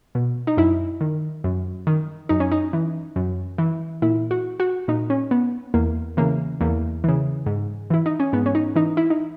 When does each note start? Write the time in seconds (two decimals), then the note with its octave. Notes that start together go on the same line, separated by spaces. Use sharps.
0.15 B2
0.47 D#4
0.57 F#2 E4
1.01 D#3
1.44 F#2
1.87 D#3
2.29 F#2 D#4
2.40 C#4
2.52 D#4
2.73 E3
3.16 F#2
3.58 E3
4.02 A#2 E4
4.31 F#4
4.60 F#4
4.88 A#2 D#4
5.10 C#4
5.31 B3
5.74 E2 A#3
6.17 C#3 E3 A#3
6.61 E2 A#3
7.04 C#3 E3
7.46 G#2
7.90 E3 E4
8.06 D#4
8.20 C#4
8.33 G#2 B3
8.46 C#4
8.55 D#4
8.76 E3 D#4
8.97 E4
9.10 D#4